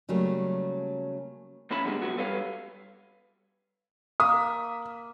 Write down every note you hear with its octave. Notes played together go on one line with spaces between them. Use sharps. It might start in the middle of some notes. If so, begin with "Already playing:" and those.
C#3 F#3 G3 A3 A#3
E2 A2 C#4 A5 B5
F#2 B2 D3 G3 G#3
G#2 C3 F3 F#3 B3 F#4
G3 A4 B4 C#5 F5
A#3 E5 D#6